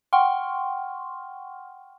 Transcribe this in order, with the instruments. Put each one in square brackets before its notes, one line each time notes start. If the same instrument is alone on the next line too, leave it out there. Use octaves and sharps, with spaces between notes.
[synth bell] F#5 G5 C6 C#6 F6